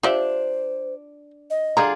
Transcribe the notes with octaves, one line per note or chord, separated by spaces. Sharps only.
D4 F4 G4 C5 E5
D#5
D3 G3 F4 G#4 D5 A#5